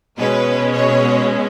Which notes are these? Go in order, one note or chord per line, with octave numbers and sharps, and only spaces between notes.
B2 G#3 C#4 B4
C#5